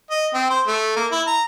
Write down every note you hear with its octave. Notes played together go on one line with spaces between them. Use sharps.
D#5
C4
C5
A3
A#3
E4
A#5